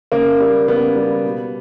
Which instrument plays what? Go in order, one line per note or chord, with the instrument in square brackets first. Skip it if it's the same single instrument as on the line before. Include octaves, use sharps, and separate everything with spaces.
[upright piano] C#3 A#3
G3
C#3 B3
G3
B2